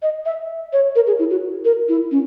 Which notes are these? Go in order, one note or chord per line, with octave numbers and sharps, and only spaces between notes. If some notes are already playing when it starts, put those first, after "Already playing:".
D#5
E5
C#5
A#4
G#4
E4
F#4
A#4
E4
C#4